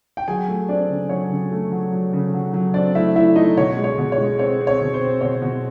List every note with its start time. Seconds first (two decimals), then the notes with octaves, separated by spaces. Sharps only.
0.17 G5
0.27 F#3 G#4 G#5
0.48 A3
0.68 C4 D4 D5
0.89 C#3
1.09 F#3 C#5
1.30 C#3
1.52 A3
1.72 F#3
1.92 F#3
2.13 C#3
2.34 F#3
2.54 F#3
2.74 C4 D4 D5
2.95 A3 E4 E5
3.16 A3 E4 E5
3.36 A3 D#4 D#5
3.57 B2 C#5
3.77 G#3
3.84 C#5
3.98 B2
4.12 C#5
4.18 G#3
4.39 C4 C#5
4.60 C4
4.67 C#5
4.81 B2
4.94 C5
5.01 C4
5.21 B2 C#5
5.42 B2